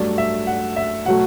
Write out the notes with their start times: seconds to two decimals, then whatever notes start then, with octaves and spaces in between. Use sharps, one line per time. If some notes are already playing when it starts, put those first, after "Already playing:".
Already playing: G2 F#3 A3 D5
0.18 E5
0.47 F#5
0.77 E5
1.06 B2 F#3 A3 F#5